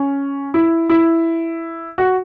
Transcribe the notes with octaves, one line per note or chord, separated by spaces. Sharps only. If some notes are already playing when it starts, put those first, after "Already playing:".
Already playing: C#4
E4
E4
F#4